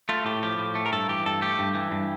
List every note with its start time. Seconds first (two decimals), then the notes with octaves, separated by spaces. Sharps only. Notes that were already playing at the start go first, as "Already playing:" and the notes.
0.09 A3 F4
0.26 A2 G4
0.43 F3 G4
0.58 A2
0.75 A3
0.86 A#4
0.92 G2 A4
1.09 E3 G4
1.26 G2 A4
1.41 A3 G4
1.59 G2
1.74 E3
1.91 G2